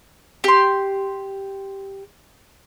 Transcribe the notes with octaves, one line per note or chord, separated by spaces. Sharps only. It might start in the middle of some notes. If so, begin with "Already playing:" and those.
G4 C6